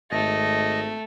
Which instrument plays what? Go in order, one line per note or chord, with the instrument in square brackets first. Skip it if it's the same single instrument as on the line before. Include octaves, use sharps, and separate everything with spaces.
[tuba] G#1 [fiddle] A3 [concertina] D#5